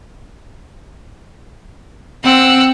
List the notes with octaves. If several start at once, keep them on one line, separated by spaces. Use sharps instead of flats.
C4 F#5 E6